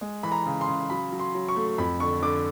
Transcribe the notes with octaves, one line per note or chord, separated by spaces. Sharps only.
G#3
E3 B5
A#5
C#3
C6
C#3
F#3 B5
F#3
C6
F#3
C#6
A3
F2 B5
D3 C#6
D3 D6